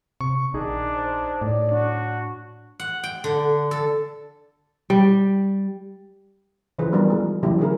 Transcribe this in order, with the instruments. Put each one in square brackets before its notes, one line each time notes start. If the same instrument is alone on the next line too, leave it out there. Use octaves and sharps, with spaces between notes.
[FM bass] C3 [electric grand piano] C#6
[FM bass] A#1 [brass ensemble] D#3 [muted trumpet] D4 [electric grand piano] D#4 G#4
[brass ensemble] C5
[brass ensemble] D2 C#5 D5 [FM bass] A2
[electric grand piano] D4 [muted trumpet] F#4
[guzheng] F#5
G5
D3
A4
[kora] G3
[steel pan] C#3 E3 F3 G#4 B4 C5
E3 G3 B3 D4 F#4 A#4
F3 G#3
C#3 E3 F#3 A3 E4 G4
D3 D#4 G#4 A#4